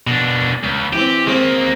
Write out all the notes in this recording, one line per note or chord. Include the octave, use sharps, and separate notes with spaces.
B2 D4
C#2
E3 C4 G4
D#3 G#3 A#3 C4